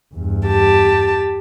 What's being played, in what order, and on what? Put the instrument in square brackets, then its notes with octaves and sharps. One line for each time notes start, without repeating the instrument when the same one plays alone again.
[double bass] E2 G2
[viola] G4 A5